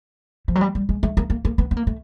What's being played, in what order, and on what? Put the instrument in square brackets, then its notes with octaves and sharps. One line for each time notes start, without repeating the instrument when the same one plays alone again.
[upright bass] F3
F#3
G3
G3
G#3
A3
A#3
A#3
A#3
B3
B3
A#3
A3